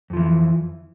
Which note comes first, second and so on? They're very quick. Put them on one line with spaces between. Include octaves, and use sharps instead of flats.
F2 F3 E3